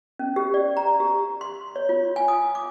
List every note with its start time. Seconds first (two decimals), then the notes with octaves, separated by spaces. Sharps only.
0.19 C#4
0.36 G4
0.54 D5
0.77 A#5
1.00 G4
1.41 C6
1.76 C#5
1.89 F4
2.16 G#5
2.28 D#6
2.55 D6